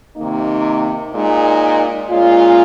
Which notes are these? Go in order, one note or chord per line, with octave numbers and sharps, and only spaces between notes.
C3 D#3 A#3 D#4
A#2 G#3 D#4
A#2 G#3 C#4 F4